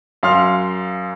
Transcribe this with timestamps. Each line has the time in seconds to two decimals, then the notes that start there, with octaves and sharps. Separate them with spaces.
0.23 F#2 F5 C6 F6